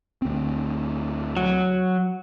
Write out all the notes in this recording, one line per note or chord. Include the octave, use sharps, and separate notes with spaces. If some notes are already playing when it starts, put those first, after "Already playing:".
D2 C4
F#3